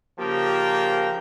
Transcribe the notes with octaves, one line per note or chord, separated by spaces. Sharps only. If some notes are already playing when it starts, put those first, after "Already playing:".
C#3 F3 A#3 G4 A#4 G5